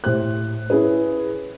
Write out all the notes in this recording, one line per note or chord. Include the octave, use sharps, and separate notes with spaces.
A2 G4 C5 F#6
C#4 E4 G#4 B4